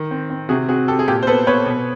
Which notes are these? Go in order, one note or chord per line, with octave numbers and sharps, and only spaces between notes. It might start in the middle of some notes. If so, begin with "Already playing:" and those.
Already playing: D#3
C4
C4
C3 F#4 G#4
C4 F#4 G#4
C4 G4 A4
G#4
A#2 G4 A4
C5
B3 A4 B4
B3 B4 C#5
B2